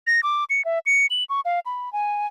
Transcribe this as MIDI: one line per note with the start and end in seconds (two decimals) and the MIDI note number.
0.07 0.20 94
0.23 0.44 86
0.50 0.64 97
0.65 0.79 76
0.86 1.06 97
1.10 1.24 102
1.30 1.40 85
1.45 1.60 77
1.66 1.92 83
1.93 2.27 80